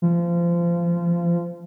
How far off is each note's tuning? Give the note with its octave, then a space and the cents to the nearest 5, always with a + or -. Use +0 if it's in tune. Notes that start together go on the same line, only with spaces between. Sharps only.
F3 -25